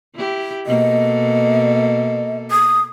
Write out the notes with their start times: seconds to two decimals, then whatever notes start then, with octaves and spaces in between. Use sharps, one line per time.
0.16 E4 G4
0.66 B2 A#3 A4 D#5
2.51 D#6